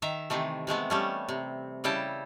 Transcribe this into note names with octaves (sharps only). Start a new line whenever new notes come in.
D#3 E5 A#5
C3 D#3 E3 A3
C3 G#3 A3 B3
G3 A3 C#4
C3
C#3 G3 E4 G5 A5